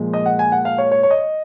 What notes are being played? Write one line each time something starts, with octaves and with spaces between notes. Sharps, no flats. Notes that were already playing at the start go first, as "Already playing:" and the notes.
Already playing: A#2 F3 G#3
D#5
F#5
G#5
F#5
F5
C#5
C#5
C#5
D#5